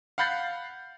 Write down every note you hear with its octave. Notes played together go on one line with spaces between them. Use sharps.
F5 F#5 B5 G6 A6 C7